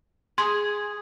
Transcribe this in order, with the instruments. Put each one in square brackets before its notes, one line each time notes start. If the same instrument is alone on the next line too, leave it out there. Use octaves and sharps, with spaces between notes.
[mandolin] G#4 [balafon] C6